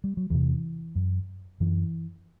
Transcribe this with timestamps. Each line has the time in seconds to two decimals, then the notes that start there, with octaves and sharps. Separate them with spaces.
0.04 G3
0.17 F#3
0.30 E2 C3 E3
0.95 F#2
1.60 F#2 E3